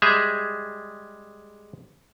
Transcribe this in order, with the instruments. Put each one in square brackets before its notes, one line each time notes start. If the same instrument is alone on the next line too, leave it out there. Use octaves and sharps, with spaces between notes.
[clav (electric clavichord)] G3 G#3 G#4 E5